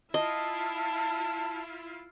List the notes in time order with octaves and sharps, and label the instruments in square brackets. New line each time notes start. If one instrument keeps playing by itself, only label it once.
[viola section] E4 F4 [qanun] D#5 [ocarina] A5